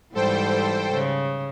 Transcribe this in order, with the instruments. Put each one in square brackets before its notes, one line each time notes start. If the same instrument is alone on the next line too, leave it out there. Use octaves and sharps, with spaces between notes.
[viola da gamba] G#2 E3 G3 [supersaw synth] A4 C5 G5
[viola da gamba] C#3